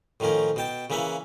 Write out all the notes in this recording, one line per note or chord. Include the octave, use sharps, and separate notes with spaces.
A2 D#3 F3 C#4 A#4
B2 G5 A5
C#3 E3 A#3 E5 F#5